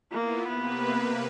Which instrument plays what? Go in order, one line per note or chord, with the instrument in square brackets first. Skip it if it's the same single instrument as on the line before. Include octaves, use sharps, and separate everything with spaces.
[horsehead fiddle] A#3 [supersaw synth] B3 E4 F4
[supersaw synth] C3 A#3 B4 [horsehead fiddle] B3